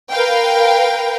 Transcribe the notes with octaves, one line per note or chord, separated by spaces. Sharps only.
A#4 B4 F5 G5